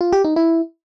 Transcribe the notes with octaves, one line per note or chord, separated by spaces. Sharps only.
F4
G4
D#4
E4